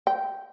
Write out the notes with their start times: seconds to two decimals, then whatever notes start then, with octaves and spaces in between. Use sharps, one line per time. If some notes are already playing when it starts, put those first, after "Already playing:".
0.07 G5